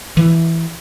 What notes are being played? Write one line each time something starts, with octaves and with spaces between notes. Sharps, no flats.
E3